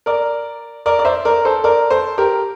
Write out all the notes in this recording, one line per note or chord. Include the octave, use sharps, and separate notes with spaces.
A#4 D5
A#4 D5
D5
C5 E5
A#4 D5
A4 C5
A#4 D5
A4 C5
G4 A#4